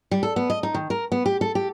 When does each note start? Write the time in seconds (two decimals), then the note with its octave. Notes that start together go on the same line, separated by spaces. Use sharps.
0.11 G3
0.23 A4
0.36 B3
0.50 D#5
0.63 D#4
0.74 D#3
0.90 A#4
1.12 B3
1.26 G4
1.41 A4
1.55 G4